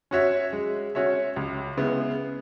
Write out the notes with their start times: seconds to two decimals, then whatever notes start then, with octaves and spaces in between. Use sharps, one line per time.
0.11 C#4 F#4 C#5 E5
0.53 G#3
0.95 C#4 F#4 C#5 E5
1.36 C#2
1.77 C#3 G#3 B3 E4